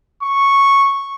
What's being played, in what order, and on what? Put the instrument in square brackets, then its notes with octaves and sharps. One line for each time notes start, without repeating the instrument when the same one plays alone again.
[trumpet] C#6